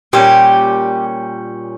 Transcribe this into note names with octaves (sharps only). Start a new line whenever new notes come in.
A#2 G3 C#4 G4